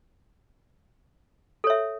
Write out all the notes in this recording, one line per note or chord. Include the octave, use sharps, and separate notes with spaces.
A4 C#5 E5